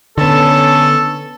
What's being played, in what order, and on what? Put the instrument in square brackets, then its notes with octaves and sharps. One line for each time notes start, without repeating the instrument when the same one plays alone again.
[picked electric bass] D3 B3 [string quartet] C#4 A5 [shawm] A4